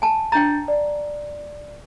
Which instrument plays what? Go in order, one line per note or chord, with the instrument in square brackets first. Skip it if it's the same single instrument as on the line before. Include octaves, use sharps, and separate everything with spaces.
[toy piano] G#5 A5
[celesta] D4 G6 A6 [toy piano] G5 A#5
[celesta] D5